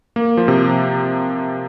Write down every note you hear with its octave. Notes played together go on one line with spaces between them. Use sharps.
A#3
F3
C3